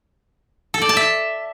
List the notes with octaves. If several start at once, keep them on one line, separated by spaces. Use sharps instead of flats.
A4
D5
A5
E5